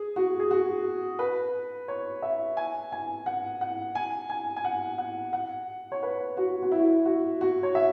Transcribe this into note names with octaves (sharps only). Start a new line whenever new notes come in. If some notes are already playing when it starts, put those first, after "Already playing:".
Already playing: G#4
F#4
G#4
F#4
B4
C#5
E5
G#5
G#5
F#5
F#5
G#5
G#5
G#5
F#5
F#5
F#5
C#5
B4
F#4
F#4
E4
F#4
F#4
C#5
E5